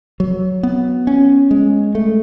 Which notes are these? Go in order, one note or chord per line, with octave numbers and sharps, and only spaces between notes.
F#3
B3
C#4
G#3
A3